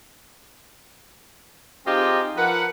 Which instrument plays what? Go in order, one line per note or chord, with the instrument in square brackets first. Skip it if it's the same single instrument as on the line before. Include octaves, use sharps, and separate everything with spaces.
[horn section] C4 D#4 F4 G4 G#4 D#5
F3 A#4 B4 F#5